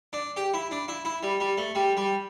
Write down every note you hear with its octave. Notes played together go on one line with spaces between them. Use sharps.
D4
G4
E4
D4
E4
E4
G3
G3
A3
G3
G3